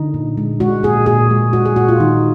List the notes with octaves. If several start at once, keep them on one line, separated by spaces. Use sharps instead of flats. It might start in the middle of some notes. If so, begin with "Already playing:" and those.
Already playing: D3 D#4
A#2
G#3
G#3 F#4
A#2 G#4
A#2 G#4
G#3
G#3 F#4
G#4
A#2 F#4
F4
D#3 D#4